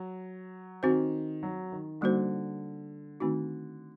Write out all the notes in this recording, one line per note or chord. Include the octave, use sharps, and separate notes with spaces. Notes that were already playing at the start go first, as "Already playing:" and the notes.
Already playing: F#3
D#3 C4 F#4 C5
F#3
D#3
D3 G3 A#3 D#4 F#4 C5
D#3 A3 C4 D#4 F#4